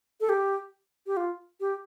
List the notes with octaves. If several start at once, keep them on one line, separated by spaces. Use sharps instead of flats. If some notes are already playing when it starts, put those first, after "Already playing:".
A4
G4
G4
F4
G4